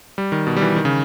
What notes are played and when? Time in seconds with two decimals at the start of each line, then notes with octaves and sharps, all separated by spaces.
0.18 G3
0.32 D#3
0.47 B2
0.56 G3
0.62 E3
0.76 D#3
0.85 C#3